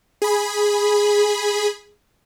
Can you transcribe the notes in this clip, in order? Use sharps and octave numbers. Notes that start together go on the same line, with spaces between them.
G#4 B5